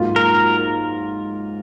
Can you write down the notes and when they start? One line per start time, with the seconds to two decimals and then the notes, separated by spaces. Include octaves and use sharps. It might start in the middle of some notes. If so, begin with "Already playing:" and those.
Already playing: G#2 F#3 A#3 F4
0.16 A#4